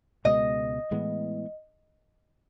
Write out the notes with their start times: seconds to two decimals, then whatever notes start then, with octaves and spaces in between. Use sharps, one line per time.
0.25 C#2 B2 G#3 B3 D#5
0.91 A2 E3 G#3 B3